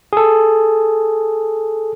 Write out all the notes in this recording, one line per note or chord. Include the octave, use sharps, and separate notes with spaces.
G#4 A4